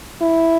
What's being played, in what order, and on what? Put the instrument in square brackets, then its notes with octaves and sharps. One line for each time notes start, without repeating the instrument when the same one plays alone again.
[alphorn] E4